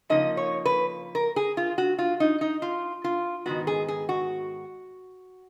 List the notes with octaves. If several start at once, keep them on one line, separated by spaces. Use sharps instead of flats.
C#3 F3 A#3 D#4 D#5
C#5
B4
A#4
G#4
F4
F#4
F4
D#4
D#4
F4
F4
G#2 D#3 G#3 B3 F#4
G#4
G#4
F#4